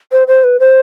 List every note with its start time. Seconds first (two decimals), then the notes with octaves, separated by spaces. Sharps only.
0.12 C5
0.28 C5
0.44 B4
0.60 C5